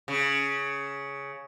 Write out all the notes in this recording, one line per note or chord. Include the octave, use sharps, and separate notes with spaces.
C#3